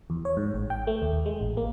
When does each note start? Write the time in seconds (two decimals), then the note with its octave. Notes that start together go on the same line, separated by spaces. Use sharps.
0.10 E2
0.25 C#5
0.37 G#2
0.54 A1
0.70 G5
0.87 A3
1.02 D#2
1.26 G#3
1.41 A1
1.57 A#3